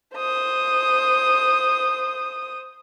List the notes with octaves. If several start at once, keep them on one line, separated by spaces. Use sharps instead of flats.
C5 D#6